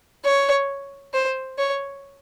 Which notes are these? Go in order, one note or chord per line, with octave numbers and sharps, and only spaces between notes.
C#5
C5
C#5